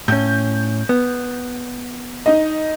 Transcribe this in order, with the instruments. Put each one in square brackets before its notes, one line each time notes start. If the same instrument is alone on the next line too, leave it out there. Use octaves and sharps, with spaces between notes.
[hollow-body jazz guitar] A2 C#4 [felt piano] G6
[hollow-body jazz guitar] B3
[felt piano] D#4 D#5